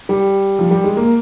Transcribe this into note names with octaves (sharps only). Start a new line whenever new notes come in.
G3
F3
G3
G#3
A#3